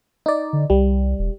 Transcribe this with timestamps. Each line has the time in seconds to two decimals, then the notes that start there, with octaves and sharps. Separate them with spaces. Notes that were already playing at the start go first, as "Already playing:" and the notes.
0.26 D#4 D5
0.53 D3
0.70 C2 G3
1.19 E1